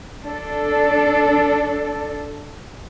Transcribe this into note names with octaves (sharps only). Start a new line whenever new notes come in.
D4 A4